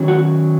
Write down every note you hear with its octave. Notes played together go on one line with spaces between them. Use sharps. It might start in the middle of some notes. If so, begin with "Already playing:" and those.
Already playing: D#3 F#3 C#4
F#4